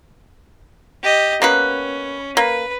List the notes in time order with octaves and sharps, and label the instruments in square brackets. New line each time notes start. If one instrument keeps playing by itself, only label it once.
[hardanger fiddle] G4 D#5
[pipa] A#3 B3 B4 [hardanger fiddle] C#4
[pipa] A#3 [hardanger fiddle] B4